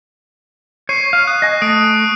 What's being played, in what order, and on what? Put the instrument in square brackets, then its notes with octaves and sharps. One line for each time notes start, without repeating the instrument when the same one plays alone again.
[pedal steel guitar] C#5 [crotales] C#6 C7 D#7
[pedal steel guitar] F5
[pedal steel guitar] D#6 [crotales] F#6
[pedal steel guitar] D#5 G#5
[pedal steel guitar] A3 [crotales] D#6 D7